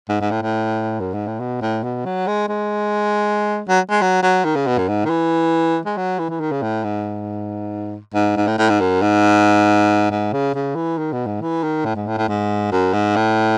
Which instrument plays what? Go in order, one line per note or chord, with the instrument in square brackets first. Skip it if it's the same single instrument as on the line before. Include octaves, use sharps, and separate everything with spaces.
[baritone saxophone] G#2
G#2
A2
A2
F#2
G#2
A2
B2
A2
B2
F#3
G#3
G#3
F#3
G#3
F#3
F#3
D#3
C#3
B2
F#2
G#2
D#3
E3
G#3
F#3
E3
E3
D#3
C#3
A2
G#2
G#2
G#2
A2
A2
G#2
F#2
G#2
G#2
C#3
C#3
E3
D#3
B2
G#2
E3
D#3
A2
G#2
A2
A2
G#2
F#2
G#2
A2